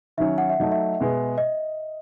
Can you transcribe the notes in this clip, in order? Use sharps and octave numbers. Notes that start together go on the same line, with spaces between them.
D#3 F#3 C#4 E5
F#5
E5
F#3 A3 D#4 D#5
E5
B2 G#3 B3
D#5